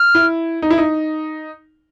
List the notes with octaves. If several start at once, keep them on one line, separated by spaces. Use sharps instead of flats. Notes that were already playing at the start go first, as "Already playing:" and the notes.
Already playing: F6
E4
D#4
E4
D#4